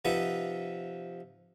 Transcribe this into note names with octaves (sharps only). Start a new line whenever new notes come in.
C3 F3 D#4 B4 E5 F#5